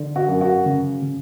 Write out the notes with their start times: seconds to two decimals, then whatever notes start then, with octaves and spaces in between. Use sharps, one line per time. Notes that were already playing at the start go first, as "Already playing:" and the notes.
Already playing: D3
0.16 F#4
0.28 F#2
0.41 F#4
0.66 C#3
1.02 C#3